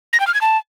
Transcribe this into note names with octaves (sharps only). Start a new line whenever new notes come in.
A#6
G5
F6
G#6
A5